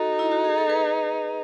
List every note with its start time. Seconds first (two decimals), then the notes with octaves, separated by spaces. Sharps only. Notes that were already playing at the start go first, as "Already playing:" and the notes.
Already playing: D#4 F#4 A4
0.19 E4
0.32 F#4
0.44 G#4
0.58 A4
0.69 G#4 B4